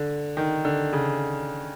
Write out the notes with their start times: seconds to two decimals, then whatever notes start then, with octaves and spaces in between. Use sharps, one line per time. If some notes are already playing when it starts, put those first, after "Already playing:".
Already playing: D3
0.37 D#3
0.65 D3
0.93 C#3